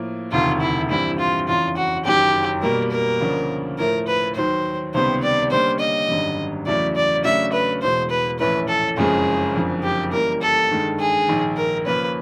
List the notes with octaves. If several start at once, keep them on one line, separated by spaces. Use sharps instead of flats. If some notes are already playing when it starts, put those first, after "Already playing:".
Already playing: A2 F3 A#3
E1 D2 C3 D#3 F4
E4
G2 E3 G3 C4 E4
F4
F1 E2 C#3 E3 F4
F#4
F#1 F#2 D#3 F#3 G4
B2 G3 A#3 A#4
A#4
D2 C#3 F3 A#3 D4
A2 F3 A3 A#4
B4
D#2 D#3 F#3 C5
C#2 C3 D#3 G3 B3 C5
D5
D3 G3 A#3 C#4 C5
D#5
G#1 F#2 D3 G3
E2 C#3 F#3 A3 D5
D5
C#3 F#3 A3 D4 E5
B4
E1 E2 B2 G#3 C5
B4
A#1 A2 E3 A3 C#4 B4
A4
F#1 F2 C#3 F3 G#3 G#4
F#1 F2 D3 F3
G4
C#3 E3 G3 A#3 A#4
A4
G2 D#3 G#3
G#4
A#1 G#2 D#3
A#4
C#3 F3 A#3 C#4 B4